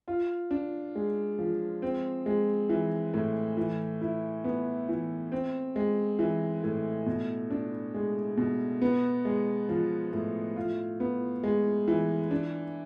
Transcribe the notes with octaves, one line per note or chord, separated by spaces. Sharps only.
F4
D4
G#3
F3
C4
G#3
E3
A2
E3
E4
B3
E3
C4
G#3
E3
A2
B2
D4
G#3
B2
B3
G#3
F3
A2
F4
B3
G#3
E3
D4